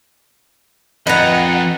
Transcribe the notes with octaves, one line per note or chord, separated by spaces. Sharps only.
F2 B4 D#5 F#5 A#5